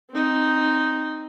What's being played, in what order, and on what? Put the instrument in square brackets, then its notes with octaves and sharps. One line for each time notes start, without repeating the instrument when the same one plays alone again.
[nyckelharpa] C4 D#4